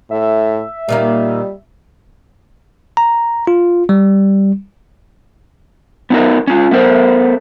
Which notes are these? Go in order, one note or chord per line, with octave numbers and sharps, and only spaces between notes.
A2 E5
A#2 D#3 G3 A#3
A#5
F4
G3
B3 D#4 F#4 A#4
C#4 F4
A3 B3 A#4 C5